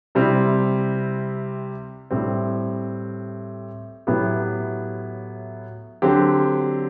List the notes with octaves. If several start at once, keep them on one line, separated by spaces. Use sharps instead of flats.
C3 G3 C4 E4
A2 G3 C4
A2 F#3 B3 E4 G4
D3 F#3 C4 G4